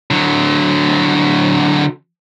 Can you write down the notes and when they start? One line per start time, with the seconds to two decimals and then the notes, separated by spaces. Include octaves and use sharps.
0.11 D3 F#3